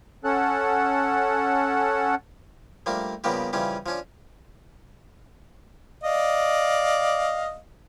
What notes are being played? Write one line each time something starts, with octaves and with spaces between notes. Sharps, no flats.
C#4 A4 F#5
F3 G3 A3 A#3 D4
C#3 F3 G3 A#3 B3 G4
C#3 E3 F3 G3 C#4
F3 C#4 D4
D5 D#5 F5